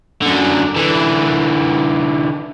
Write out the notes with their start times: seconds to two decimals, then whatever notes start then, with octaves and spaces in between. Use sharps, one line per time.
0.22 F#2 D3
0.76 D3 E3